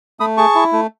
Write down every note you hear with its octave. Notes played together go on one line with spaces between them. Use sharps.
A3 B5 D#6
G#4 A5 C#6
E4
A3